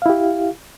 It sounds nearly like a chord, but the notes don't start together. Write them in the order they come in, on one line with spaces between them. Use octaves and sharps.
F5 E4 G4